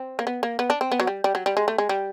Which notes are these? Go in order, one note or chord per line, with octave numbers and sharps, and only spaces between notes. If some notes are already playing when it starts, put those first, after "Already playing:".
Already playing: C4
A#3
B3
A#3
B3
D4
C4
B3
F#3
G3
G3
F#3
G3
G#3
A3
G#3
G3